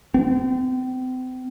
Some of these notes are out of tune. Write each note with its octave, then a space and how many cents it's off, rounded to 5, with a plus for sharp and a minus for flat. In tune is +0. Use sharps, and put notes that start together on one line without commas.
C4 -40